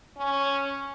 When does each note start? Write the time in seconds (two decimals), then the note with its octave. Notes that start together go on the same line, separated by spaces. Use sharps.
0.17 C#4